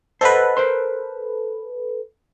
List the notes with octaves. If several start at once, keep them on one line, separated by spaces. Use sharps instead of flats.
A4 B4 C5 D#5 F#5
A#4 C5 C6